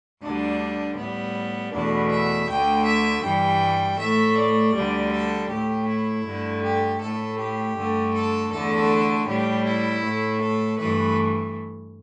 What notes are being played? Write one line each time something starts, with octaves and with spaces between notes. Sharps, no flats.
D2 D3 G3 D4
A2 G3 B3
E2 B2 A3 D4
E5
D2 D3 A3 G5
E5
G2 E3 G3 G5
A2 A3 E5
D5
D2 D3 G3
A4
A2 A3 G4
E4
G2 D3 A3
G4
A2 A3 A4
G4
G2 D3 A3
A4
E2 D3 A3 A4
A2 G3 G4
E4
A2 A3
A4
G2 E3 A3 B4